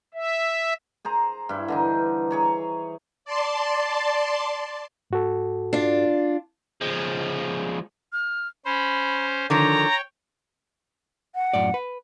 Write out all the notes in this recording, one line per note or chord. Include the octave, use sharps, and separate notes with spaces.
E5
G#4 C5 A#5
G2 E4
D3 E3 D#4
G#4 C#5 A#5
D5 A5 C6
G#2 F#4 A4
D4 F4
F3 G#3
F6
C#4 C5 B5
D3 D#3 F3 C#5 G5 A#5
F#5
F#2 A2 D5
B4